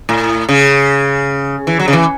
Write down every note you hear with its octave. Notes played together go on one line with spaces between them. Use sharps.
A2
C#3
E3
F#3
C#3
E3